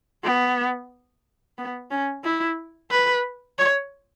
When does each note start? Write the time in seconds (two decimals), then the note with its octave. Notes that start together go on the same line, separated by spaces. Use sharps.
0.24 B3
1.58 B3
1.91 C#4
2.24 E4
2.91 B4
3.59 C#5